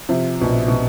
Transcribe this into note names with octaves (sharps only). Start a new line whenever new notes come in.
C3 F3
A#1 B2
B2